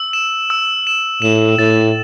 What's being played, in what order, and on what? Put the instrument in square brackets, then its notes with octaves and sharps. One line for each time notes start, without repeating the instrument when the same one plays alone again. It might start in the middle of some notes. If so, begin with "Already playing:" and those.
Already playing: [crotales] E6
E7
E6
E7
[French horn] A2 [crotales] E7
[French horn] A2 [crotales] A6